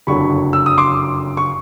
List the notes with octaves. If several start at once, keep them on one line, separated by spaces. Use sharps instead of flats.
F#1 F2 D3 F#3 B5 C#6
E6
D#6
C6 D6
C#6